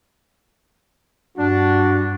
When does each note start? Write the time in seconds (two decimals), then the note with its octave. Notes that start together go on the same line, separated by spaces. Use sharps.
1.38 G2 D4 F#4